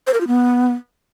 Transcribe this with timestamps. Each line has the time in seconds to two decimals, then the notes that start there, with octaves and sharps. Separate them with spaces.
0.07 C5
0.14 A#4
0.21 F4
0.27 B3